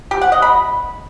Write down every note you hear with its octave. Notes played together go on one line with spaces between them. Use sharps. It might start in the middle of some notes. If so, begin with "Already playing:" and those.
G4
F#5
D#5
B5